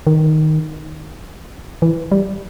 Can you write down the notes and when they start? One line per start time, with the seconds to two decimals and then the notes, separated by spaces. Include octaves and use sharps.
0.07 D#3
1.82 E3
2.12 G3